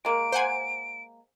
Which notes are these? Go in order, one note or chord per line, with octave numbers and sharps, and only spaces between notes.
G#3 A#3 D7
C5 F#5 G#5